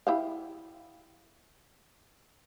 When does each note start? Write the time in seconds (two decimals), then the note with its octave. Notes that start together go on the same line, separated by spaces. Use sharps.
0.07 E4 G4 F5